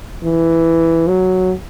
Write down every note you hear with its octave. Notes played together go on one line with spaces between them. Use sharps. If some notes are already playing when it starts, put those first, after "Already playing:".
E3
F#3